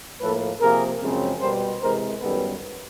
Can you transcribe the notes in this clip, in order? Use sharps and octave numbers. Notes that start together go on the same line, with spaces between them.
A2 F3 A#3 A4 B4
C3 F3 A#3 G#4 A#4
F#2 C#3 F3 G#3 C4
B2 G3 B3 A#4 C5
C3 E3 G#3 A#4 C5
F#2 D#3 G3 B3 A4 B4